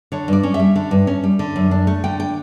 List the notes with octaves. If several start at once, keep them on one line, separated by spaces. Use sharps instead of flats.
D3 C#5
G2 D5
C#4
E5
G3
D3
G2
C#4
G3
D3
F#2
D4
A3
D3 G5
G5